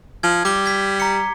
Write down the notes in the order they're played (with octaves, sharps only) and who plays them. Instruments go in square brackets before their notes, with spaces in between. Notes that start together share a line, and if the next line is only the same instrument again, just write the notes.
[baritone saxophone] F3 [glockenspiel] G#6
[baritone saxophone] G3 [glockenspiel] D6 G7
[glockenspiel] G#6 B6
A#5 C#7